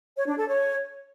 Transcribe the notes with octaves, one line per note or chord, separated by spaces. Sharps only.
C#5
D4
A4
C#5